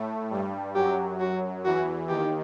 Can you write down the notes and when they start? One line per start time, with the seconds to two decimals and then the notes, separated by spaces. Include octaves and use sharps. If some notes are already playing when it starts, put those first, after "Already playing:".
Already playing: A2 A3
0.31 G2 G3
0.75 F#2 F#3 G4
1.20 F#4
1.65 E2 E3 F#4
2.09 D#2 D#3 G4